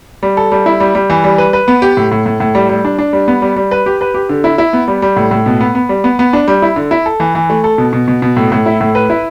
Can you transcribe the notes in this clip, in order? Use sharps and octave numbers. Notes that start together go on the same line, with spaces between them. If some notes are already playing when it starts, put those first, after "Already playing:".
G3
A4
G3
E4
G3
G3
E3
G3
B4
B4
B3
G4
A2
A2
A2
A2
G3
G3
D4
D4
G3
B3
G3
G3
B4
G4
B4
G4
D3
E4
E4
B3
G3
G3
A2
A2
B2
B3
B3
G3
B3
B3
D4
G3
E4
D3
E4
A4
E3
E3
A3
A4
B2
B2
B2
B2
A2
A2
E4
A2
B4
E4